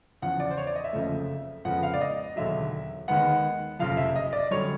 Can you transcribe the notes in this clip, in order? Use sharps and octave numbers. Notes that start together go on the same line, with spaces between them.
E2 C#3 F3 F#5
D5
C5
C#5
D5
D#5
E5
F#1 F2 C#3 F3 A3
F2 C#3 F3 G#3 B3 F#5
F5
D5
D#5
E1 D#2 D3 F#3 E5
D#2 D#3 G#3 B3 F#5
F#1 F2 C3 F3 F5
E5
D#5
D5
F#2 D3 G3 C#5